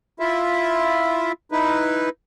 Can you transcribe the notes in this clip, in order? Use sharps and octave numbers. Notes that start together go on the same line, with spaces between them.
E4 F4 E5
D#4 E4 B4